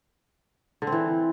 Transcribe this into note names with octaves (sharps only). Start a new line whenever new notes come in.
D3
C4
E3